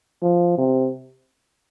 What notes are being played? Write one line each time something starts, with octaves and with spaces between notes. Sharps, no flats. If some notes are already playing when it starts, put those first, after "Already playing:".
F3
C3